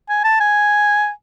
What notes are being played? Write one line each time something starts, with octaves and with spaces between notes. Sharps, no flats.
G#5
A5
G#5